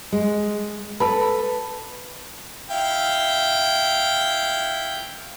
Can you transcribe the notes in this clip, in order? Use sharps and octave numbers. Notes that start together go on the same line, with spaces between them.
G#3
A4 B4 B5
E4 F5 G5